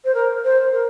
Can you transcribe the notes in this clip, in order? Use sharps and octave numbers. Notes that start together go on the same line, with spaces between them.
C5
A#4
C5
A#4